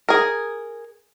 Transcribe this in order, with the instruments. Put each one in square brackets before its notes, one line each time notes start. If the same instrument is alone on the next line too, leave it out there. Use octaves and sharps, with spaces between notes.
[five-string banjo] G#4 A#4